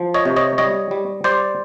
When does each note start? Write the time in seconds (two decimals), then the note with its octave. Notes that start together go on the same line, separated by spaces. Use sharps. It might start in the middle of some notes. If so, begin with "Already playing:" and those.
Already playing: F3
0.14 C#5 D#5
0.25 C3
0.36 C#5 D#5
0.58 G3 C#5 D#5
0.91 G3
1.24 G3 C5 D5